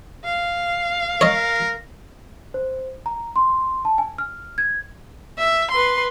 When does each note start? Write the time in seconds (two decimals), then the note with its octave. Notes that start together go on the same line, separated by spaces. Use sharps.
0.25 F5
1.21 A#4 C#5 D#5
2.54 C5
3.06 A#5
3.36 C6
3.85 A5
3.98 G#5
4.18 F6
4.58 G#6
5.38 E5
5.71 B4 C6